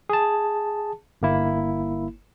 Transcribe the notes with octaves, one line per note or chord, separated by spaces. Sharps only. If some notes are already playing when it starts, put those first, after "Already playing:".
G#4 A5
G1 A#3 E4